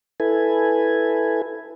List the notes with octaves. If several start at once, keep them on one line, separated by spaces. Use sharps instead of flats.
E4 A4 B4 G#5